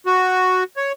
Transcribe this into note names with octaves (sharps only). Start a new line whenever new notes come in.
F#4
C#5